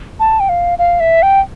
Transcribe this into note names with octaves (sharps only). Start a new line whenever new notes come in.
A5
G5
F5
F5
E5
G5